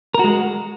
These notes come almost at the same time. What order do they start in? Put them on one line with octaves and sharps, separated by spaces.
A#4 F#4 G#3